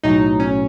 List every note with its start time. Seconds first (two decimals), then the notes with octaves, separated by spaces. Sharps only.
0.03 B1 A2 F#3 D#4
0.40 C#4